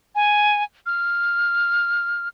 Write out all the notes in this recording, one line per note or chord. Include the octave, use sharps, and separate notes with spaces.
G#5
F6